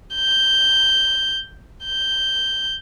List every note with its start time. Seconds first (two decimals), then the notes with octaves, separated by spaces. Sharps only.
0.16 G6
1.85 G6